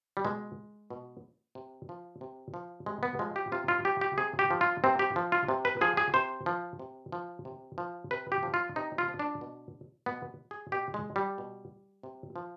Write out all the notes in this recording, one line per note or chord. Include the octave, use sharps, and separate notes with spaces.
G3
B2 G#3
B2
C3
F3
C3
F3
C3 G#3
B3
F3 G#3
G4
C3 F4
F4
F3 G4
G4
C3 G#4
G4
F3
F4
C3 C4
G4
F3
F4
C3
B4
F3 G#4
G#4
C3 C5
F3
C3
F3
C3
F3
C3 B4
G4
F3
F4
C3 D#4
F4
F3
D4
B2
B2 B3
G#4
B2 G4
G#3
G3
B2
C3
F3